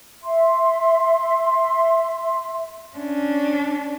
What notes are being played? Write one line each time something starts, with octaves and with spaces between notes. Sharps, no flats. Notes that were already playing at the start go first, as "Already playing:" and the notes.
E5 C6
C#4 D4